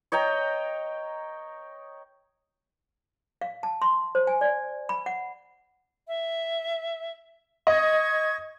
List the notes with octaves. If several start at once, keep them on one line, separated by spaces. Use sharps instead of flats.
C#5 D#5 G5 A#5
F5
A5
C6
C5
G#5
D5
B5
F#5
E5
D#5 C#6 G#6